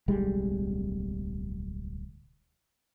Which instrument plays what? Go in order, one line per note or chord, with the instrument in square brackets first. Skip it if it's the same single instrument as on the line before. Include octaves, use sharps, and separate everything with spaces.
[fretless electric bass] D1 B1 G3 G#3